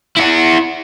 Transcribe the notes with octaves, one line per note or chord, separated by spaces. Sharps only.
E4 F#5